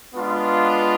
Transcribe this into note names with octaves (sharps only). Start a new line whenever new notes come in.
G#3 B3 D4 F4